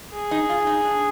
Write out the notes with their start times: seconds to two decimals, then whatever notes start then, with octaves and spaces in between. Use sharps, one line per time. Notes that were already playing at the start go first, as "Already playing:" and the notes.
0.13 G#4
0.31 D#4
0.49 F4
0.67 D#4
0.85 D4